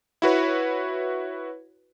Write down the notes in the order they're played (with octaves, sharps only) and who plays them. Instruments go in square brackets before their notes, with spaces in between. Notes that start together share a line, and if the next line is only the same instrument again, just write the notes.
[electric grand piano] E4 F#4 B4 C#5